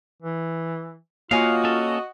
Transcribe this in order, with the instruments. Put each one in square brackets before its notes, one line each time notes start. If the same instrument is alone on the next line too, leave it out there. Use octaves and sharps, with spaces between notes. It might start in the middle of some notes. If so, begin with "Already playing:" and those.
[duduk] E3
[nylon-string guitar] A#3 C#5 G#5 [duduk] F4 [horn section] F#4 D#5 [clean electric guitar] F5
[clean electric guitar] C#4 A4